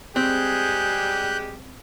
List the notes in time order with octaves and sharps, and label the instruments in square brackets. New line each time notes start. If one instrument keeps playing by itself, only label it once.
[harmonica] G3 G#3 G4 [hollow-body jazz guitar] C4 [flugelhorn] G#4 [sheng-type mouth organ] F#6 G6